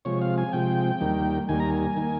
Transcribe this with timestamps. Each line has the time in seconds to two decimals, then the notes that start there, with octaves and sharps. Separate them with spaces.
0.05 C3 F3 G#3 C#5
0.22 F5
0.38 G#5
0.53 C3 F3 G#3 G5
1.01 D#2 D#3 G3 A#3
1.49 D#2 D#3 G3 A#3 G#5
1.60 A#5
1.70 G#5
1.97 D#3 A#3